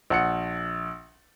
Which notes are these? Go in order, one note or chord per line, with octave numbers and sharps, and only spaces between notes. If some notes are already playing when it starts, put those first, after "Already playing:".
A#1 F#5 C#7